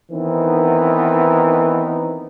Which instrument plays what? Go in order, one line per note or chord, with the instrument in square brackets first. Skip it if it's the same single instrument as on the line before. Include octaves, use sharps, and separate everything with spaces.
[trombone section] D#3 E3 B3 C4 D#4